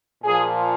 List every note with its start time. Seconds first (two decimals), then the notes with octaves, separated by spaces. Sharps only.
0.23 A#2 F3 G#4